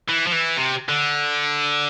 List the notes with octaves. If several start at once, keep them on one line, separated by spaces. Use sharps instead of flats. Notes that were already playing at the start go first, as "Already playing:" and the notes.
E3
F3
E3
C3
D3